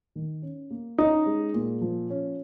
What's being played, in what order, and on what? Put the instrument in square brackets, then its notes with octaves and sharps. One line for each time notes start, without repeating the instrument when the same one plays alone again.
[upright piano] D#3
C#4
A#3
[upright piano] C#4 [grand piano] D#4
[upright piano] G#3
A#2
F3
C#4